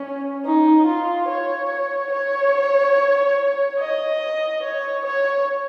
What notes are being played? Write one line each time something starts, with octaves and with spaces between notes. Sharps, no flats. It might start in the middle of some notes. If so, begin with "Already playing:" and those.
Already playing: C#4
D#4
F4
C#5
C#5
D#5
C#5
C#5